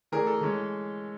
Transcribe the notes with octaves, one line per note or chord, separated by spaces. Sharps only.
E3 A3 D4 G#4 A#4
A4
E3 G#3 C#4